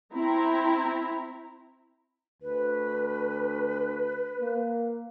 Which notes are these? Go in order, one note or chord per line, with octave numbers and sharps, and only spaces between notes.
C4 E4 A#5
D2 B4
A#3